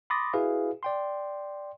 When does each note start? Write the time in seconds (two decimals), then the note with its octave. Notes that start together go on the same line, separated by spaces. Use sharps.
0.10 B5 C6 D6 D#6 A6 A#6
0.33 E4 F#4 G#4 B4 F5
0.83 D5 G5 C6